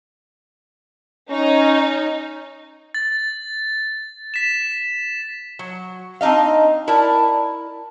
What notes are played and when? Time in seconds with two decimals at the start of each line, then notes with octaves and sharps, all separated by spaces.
1.30 C#4 D#4
2.94 A6
4.34 B6 E7
5.59 F#3
6.21 C4 D4 D#4 D#5 F5
6.88 E4 A#4 D5 A5